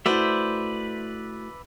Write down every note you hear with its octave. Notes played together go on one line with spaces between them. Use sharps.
A3 E4 F#4 B4 C5 D5 E5